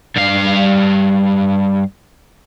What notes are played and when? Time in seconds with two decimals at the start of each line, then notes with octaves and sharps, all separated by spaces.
0.16 G2 F5